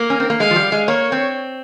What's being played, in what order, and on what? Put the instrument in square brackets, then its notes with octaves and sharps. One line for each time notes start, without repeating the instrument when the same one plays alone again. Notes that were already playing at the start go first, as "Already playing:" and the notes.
Already playing: [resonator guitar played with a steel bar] A#3 [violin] A#4
[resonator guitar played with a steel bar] C#4
C4
A#3
[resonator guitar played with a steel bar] G#3 [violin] F5
[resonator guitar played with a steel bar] F3
G3
G#3
[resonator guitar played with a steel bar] A#3 [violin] C#5
[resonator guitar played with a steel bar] C4